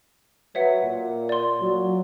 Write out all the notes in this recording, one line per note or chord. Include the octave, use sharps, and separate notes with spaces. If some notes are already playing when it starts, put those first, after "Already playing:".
F#3 B4 C#5 E5 F#5
A#2
D5 C6
A#2 F#3